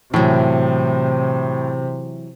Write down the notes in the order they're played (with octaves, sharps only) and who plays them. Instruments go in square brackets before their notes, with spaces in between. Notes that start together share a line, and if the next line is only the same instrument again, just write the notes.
[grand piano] A2 [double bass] C3 [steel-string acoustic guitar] E3 F#3